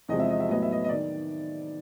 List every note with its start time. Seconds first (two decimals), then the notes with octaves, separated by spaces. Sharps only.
0.09 E2 C3 F3 G#3 C4 D#5
0.20 E5
0.30 D#5
0.40 E5
0.49 A2 F#3 B3 D#5
0.62 E5
0.72 D#5
0.84 D#5
0.89 D#3 D5